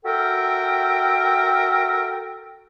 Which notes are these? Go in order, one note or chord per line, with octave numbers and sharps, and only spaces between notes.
F#4 A4 A#4 E5 G5